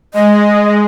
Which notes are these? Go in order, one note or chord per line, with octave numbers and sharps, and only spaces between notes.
G#3 D#5